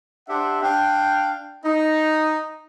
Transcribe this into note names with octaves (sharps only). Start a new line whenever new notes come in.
D4 G4 C5 E5 F#5
D4 F5 G5
D#4